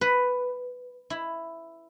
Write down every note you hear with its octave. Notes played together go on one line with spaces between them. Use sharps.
B4
E4